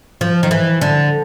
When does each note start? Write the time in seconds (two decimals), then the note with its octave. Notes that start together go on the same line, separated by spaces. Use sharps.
0.21 F3
0.43 D#3
0.51 E3
0.81 D3